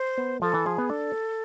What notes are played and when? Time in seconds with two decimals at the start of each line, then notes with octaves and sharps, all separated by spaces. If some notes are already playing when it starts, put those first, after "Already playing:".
Already playing: C5
0.18 B3
0.42 F3 A4
0.54 E3
0.66 F3 G#4
0.78 B3
0.90 D4 A4